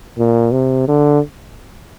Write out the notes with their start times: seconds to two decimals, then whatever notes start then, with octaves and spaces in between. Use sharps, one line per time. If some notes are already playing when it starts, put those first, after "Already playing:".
0.18 A#2
0.52 C3
0.88 D3